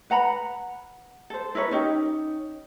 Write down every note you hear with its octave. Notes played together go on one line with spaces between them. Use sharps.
B4 F#5 A#5 B5
A4 C5
E4 A#4 B4 C#5
C#4 D#4 G4